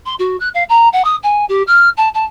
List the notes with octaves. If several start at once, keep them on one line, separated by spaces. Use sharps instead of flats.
C6
F#4
F#6
F5
A#5
F#5
D#6
G#5
G4
F6
A5
A5